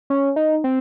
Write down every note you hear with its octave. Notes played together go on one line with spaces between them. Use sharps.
C#4
D#4
C4